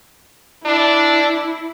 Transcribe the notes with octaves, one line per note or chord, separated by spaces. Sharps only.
D4 E4